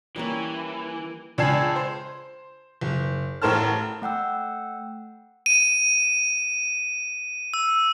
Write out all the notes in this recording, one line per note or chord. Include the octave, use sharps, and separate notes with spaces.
E3 G3 A#3 C#4
C#2 D4 G#5 A5 G#6 C7
C5
F#1
A1 A2 A#4 C5 A5 F6
A3 F#5 G5 E6
D#7
E6